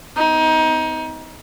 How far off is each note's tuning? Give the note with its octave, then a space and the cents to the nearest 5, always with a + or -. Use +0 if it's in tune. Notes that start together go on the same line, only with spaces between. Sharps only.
C4 -40 D#4 +25